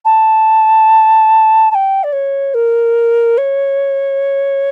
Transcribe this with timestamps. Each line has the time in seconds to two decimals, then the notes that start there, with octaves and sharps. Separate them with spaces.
0.05 A5
1.71 A5
1.75 G5
2.04 D5
2.13 C#5
2.54 A#4
3.38 C#5